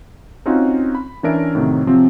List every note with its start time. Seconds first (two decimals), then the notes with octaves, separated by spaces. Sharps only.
0.46 C4 C#4 D#4 F4 F#4
0.95 B5
1.23 E3 C#4 D4 A#4 E5 D7
1.55 A2 C3 D#3 F#3
1.87 C3 F3 F#3 C4